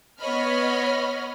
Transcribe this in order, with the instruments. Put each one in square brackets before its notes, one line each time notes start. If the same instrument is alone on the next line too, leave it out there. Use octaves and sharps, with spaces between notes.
[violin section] B3 C#5 D#5 B5 F6